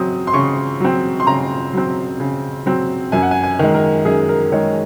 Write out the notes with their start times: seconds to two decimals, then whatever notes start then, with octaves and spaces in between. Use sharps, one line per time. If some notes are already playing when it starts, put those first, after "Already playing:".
Already playing: C#3 F#3 C4 D#6
0.27 C6
0.33 C#3 C#6
0.80 F#3 C4
1.20 C6
1.27 C#3 A#5
1.73 F#3 C4
2.20 C#3
2.66 F#3 C4
3.12 F#2 G#5
3.22 F#5
3.31 G#5
3.43 G#5
3.59 D#3 G#3
3.74 A#4
4.05 F#2 G#4
4.29 A#4
4.52 D#3 G#3 C#5